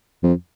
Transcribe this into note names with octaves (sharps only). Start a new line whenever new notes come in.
F2